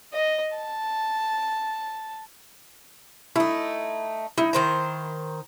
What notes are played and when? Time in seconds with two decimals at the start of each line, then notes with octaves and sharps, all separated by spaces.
0.13 D#5
0.56 A5
3.36 A3 D#4 E4
4.38 D#4 E4
4.53 D#3 C5 A#5